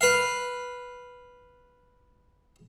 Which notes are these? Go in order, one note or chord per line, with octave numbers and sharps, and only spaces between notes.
B4 F5